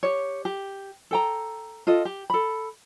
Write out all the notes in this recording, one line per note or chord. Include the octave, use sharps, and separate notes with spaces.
G4 C#5
G4
A4 G5 A#5
F4 A4 D#5
G4
A4 B5